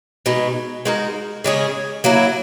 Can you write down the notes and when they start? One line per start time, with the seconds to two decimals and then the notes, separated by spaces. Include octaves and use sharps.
0.26 B2 G#3 D#4
0.85 G#3 D#4 F#4 A#4
1.44 C#3 G#3 C#4 G#4
2.04 F#3 A#3 E4